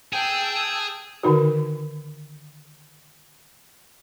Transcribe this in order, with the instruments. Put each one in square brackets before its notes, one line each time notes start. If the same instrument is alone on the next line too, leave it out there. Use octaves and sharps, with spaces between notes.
[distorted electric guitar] G#4 [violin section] G5 A5 E6
[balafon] D3 D#3 D#4 F#4